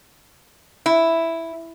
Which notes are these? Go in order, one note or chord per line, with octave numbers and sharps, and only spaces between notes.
E4